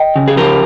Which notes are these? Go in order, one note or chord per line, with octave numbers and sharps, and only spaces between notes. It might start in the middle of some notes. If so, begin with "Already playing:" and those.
Already playing: D#5 G5
C#3
G#4
F3 G4 A#4